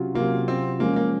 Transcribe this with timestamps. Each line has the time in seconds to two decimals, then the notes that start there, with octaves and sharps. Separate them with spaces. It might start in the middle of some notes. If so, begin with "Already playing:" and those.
Already playing: C3 F#3 C#4 F4
0.15 C3 F#3 A#3 C#4 F4
0.48 C4
0.79 F3 G#3 A#3 C#4
0.96 A#3